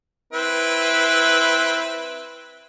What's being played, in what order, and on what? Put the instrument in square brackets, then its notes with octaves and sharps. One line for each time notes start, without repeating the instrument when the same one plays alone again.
[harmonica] C4 E4 B4